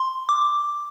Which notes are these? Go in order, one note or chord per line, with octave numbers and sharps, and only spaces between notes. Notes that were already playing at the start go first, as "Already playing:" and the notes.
Already playing: C6
D6